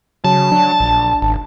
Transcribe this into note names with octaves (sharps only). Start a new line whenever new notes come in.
C#3 F#3 A5
F#3 D4
A#1
G#1